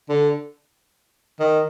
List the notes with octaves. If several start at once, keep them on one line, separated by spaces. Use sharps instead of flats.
D3
D#3